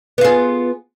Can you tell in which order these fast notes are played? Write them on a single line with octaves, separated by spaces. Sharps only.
B3 F4 G#4